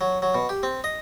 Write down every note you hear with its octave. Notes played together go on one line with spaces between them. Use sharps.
F#3
F#3
B2
G4
C4
D#5